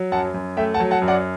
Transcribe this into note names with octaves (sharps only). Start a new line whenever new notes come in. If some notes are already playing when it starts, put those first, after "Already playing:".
Already playing: F#3
F#2 F#5 A5
F#2
A3 E5 G5
F#5 A5
F#3
F#5 A5
F#2
D5 F#5